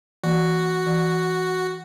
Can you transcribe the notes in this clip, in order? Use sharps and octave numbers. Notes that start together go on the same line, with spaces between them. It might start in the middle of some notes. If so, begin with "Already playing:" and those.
E3 A#3 F#4
E3